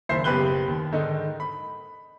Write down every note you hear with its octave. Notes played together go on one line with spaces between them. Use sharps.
F#1 D#2 C5 E5 C7
F#1 B2 G4 B4 F#6 G7
D#2
G#2 D3 D#3 D#4
B5